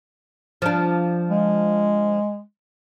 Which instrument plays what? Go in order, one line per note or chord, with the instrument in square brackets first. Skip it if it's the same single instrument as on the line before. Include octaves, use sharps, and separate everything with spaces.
[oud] F3 D4
[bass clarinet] G#3